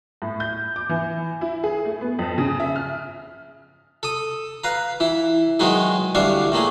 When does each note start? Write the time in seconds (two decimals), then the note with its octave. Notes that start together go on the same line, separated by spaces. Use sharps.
0.22 A2
0.40 G6
0.76 D6
0.89 E3
1.41 E4
1.64 G#4
1.85 A3
2.01 B3
2.19 F2
2.38 C#3
2.60 E5
2.76 F6
4.03 A4 D#6
4.64 B4 F5 A#5
5.00 E3 E4
5.60 D#3 F#3 G#3 B3 D#4 G#4
6.15 D2 E3 G3 D4 F5 C#6
6.52 A2 A3 A#3 G#4